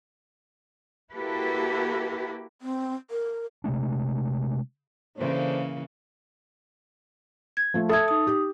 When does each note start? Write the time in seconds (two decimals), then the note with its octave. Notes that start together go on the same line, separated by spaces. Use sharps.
1.14 A#3 E4 F#4 G4 A4 B4
2.62 C4
3.11 A#4
3.64 C3 G#3 A3 D4
5.17 C#3 E3 A#3 D4 A4 C5
7.57 G#6
7.74 F3 A3
7.89 A4 E5 D#6 E6 G#6
8.08 D#4 D#6
8.27 G4